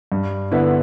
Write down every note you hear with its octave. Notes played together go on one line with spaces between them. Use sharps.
G2
D3 B3 E4 B4